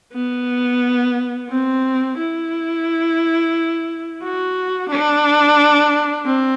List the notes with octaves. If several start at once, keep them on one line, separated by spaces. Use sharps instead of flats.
B3
C4
E4
F#4
D4
C4